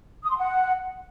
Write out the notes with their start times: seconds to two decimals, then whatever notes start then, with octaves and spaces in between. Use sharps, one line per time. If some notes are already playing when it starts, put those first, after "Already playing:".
0.23 D#6
0.30 C6
0.36 F#5